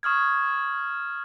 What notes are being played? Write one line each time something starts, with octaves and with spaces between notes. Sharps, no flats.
C#6 D#6 F6 G#6